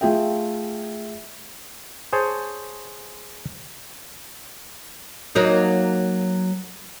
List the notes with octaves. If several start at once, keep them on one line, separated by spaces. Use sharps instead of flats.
A3 F4 G#4 E5 G5
G#4 C5 C#5 A5
F#3 A#3 D#4